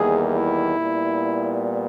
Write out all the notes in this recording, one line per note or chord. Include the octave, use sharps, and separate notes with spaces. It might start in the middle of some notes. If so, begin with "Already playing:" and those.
Already playing: E2 D#3 G3 A#3 G#4
E4
A#2 G3 B3